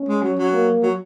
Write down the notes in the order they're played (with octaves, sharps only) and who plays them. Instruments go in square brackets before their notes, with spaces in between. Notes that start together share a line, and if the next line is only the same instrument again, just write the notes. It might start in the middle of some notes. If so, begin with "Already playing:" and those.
Already playing: [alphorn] C#4
[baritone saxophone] G#3
F#3
F#3
[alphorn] A#3
[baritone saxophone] F#3